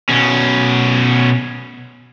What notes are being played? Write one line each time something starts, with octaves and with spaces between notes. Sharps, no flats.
B2 C#4